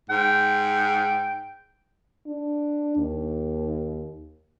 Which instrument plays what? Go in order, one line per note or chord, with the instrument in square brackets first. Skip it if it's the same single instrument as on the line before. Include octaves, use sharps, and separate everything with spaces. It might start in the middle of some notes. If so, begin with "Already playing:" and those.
[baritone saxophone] G#2 [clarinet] G5
[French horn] D4
D#2